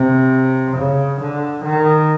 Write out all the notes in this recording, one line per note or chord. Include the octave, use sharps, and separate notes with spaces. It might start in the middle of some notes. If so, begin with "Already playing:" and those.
Already playing: C3
C#3
D3
D#3